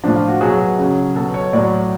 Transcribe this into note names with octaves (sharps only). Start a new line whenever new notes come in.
A2 F3 D4
F4
F#4
B2 F#3 G#4
C#3 F#3
B2 F#3 A4
C#5
A2 F#3 D5